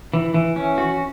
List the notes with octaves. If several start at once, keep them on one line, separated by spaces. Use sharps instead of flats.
E3
E3
C#4
F#4